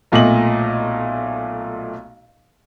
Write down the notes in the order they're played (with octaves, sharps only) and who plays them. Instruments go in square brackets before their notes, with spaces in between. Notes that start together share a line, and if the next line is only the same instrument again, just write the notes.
[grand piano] B1 A#2 A3 D#5 F#7